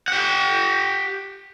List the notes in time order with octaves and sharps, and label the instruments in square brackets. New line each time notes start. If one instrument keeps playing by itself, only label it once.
[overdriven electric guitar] G4 F#5